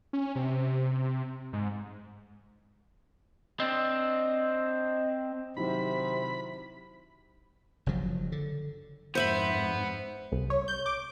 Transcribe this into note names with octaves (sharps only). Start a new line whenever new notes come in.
C#4
C3
G#2
C4 D4 D#5
C3 D#3 F#3 E4 B5
F#1 C#3 F3 F#3
D3
F2 G#2 B3 C5 E5 B5
C2
C#5
G6
D6